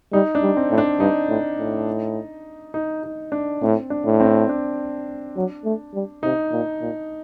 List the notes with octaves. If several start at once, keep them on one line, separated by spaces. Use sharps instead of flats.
G3 D#4
D4
G3
C4
A2
D4
G2 D#4
A2
A2
D#4
D#4
D4
A2 C4
D4
A2
C4
D4
F#3
A3
G3
C3 D#4
A#2
A#2